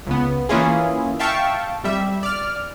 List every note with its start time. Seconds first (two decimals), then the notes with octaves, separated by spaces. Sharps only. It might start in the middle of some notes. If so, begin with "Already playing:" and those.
0.07 C#2 C#3 B3
0.49 E3 A#3 C#4 E4 F4 G#4
1.20 E5 F5 G5 A5 C#6
1.84 F2 G3 E5
2.23 D5 F6